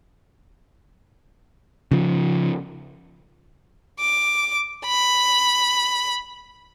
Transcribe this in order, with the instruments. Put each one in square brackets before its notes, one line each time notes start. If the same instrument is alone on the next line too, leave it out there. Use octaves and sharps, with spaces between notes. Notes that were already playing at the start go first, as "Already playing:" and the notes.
[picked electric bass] C#3 F3
[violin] D6
B5